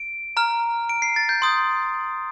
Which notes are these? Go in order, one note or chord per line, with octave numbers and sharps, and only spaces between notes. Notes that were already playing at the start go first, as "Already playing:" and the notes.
Already playing: D7
A#5 F6
D7
C7
A6
G6
C6 D#6 G6